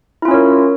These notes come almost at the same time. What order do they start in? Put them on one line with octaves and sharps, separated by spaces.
E4 F4 C#4 C#5 A#4